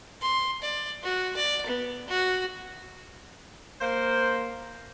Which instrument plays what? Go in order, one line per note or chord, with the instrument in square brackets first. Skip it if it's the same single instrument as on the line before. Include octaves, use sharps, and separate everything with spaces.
[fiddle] C6
D5
F#4
D5
B3
F#4
[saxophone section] A#3 C5